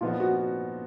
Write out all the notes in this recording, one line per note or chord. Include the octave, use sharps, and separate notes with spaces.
A#2 F3 B3 D#4 F4
F#4